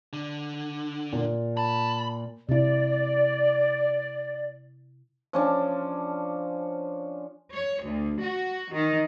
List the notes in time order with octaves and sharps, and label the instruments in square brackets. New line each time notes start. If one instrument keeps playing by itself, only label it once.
[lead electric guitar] D3
[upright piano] A#2
[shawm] A5 [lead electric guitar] B5
[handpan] C3 E4 [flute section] D5
[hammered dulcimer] F3 C#4 D4
[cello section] C#5
D2
F#4
D#3